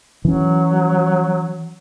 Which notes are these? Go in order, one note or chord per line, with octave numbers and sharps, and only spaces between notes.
E3 F#3 C#4